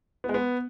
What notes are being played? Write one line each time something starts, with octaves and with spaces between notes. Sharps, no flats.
B3
G#3
B3